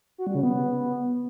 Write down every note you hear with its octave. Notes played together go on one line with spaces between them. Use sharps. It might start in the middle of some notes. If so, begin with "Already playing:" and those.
F#4
G3
C#3
B3